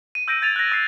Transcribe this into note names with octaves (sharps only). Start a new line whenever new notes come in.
D#7
E6 G6 A#6 D7 D#7
G#6 A6 D#7 F7
F#6 A#6
E6 C7